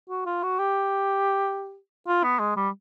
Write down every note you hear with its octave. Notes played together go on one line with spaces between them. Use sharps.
F#4
F4
F#4
G4
F4
B3
G#3
G3